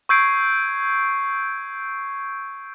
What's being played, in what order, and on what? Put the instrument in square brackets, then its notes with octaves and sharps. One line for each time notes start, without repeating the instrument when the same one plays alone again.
[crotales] C#6 E6 G6 G#6 C7 D7